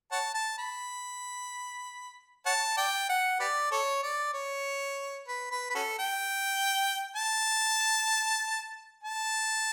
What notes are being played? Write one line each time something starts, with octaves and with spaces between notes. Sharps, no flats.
C#5 F#5 A5
A5
B5
C#5 F#5 A5
D5 G5
F#5
G4 B4 D5
A4 C#5
D5
C#5
B4
B4
B4
C#4 F#4 A4
G5
A5
A5